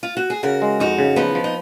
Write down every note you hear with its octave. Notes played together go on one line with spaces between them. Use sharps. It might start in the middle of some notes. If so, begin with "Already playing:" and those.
F4
F#4
G#4
C#3 F#4 A#4
G#3
F2 D#4 F#4
C#3
F3 B3 D#4
F3
D#4